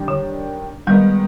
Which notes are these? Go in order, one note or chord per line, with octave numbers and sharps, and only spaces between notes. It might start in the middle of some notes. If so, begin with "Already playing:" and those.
Already playing: D#3 G3 D4 G4
D3
D#3 G3 G#3 B3 D#4